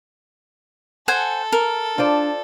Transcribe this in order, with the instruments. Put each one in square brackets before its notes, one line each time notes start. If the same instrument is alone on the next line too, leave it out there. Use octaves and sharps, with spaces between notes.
[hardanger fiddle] A4 [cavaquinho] C5 F#5 G#5
[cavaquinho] A#4
[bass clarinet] D4 [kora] F4 C5 D5